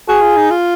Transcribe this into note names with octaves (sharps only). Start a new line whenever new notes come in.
F#4 G#4
F4
D#4
F4